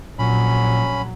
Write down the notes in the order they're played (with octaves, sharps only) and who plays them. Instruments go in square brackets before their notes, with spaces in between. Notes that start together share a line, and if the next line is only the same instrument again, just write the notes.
[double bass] A#1 F#3 [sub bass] A#2 [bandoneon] C#4 B5